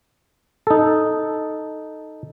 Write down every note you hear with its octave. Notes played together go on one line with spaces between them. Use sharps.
D#4 A4